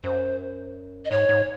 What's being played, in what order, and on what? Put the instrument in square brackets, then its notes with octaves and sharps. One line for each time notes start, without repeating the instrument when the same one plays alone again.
[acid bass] F#2 [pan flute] C5
[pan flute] D#5
[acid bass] G#2 [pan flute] C#5
[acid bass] G#2